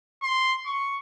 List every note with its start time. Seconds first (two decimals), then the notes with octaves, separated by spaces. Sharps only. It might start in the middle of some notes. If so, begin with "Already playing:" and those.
0.23 C6
0.66 C#6